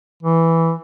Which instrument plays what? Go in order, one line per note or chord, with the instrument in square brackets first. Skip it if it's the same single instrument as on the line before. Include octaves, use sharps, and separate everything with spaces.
[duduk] E3